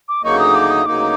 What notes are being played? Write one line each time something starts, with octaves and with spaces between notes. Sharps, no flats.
D6
D2 C#3 F#3 A#3 D#4 C#6
D#6
D6
D#6
D2 C#3 F#3 A#3 D#4 D6